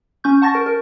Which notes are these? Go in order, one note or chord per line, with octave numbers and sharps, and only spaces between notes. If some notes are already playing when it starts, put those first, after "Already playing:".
C#4 C#6 G6
F#5 A5 C#6 A6 A#6
A#4
A#4